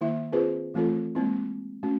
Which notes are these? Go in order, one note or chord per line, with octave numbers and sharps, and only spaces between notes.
D#3 A#3 E4 E5
C4 F4 G#4 B4 C5
E3 A3 C4 F4 A4
G#3 A#3 C4 E4
A3 C#4 F#4